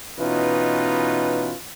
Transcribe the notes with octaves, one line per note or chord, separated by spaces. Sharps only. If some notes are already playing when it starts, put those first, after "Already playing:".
B2 E3 C#4 D#4 F4 B4